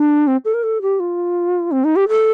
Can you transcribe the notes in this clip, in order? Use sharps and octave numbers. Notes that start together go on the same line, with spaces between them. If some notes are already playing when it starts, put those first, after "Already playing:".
Already playing: D4
C4
A4
A#4
A4
G4
F4
C4
D#4
G4
A4